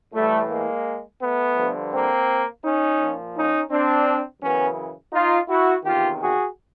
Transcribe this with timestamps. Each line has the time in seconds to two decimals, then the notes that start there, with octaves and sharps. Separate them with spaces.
0.14 A2 E3 G3 A3
0.50 G#3 A#3
1.21 A3 B3
1.57 G2 D3 F3
1.93 A#3 C4
2.64 C#4 D#4
3.00 A#2 F3
3.35 C#4 D#4
3.71 C4 D4
4.42 F#2 C#3 E3 B3 C#4
5.13 D#4 F4
5.49 E4 F#4
5.84 E2 C3 D#3 F4 G4
6.20 F#4 G#4